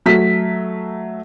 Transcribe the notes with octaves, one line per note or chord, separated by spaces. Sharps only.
F#3 A3 B6